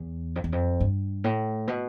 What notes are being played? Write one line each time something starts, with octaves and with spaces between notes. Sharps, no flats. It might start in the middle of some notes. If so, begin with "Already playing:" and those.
Already playing: E2
F2
E2
F2
G2
A2
B2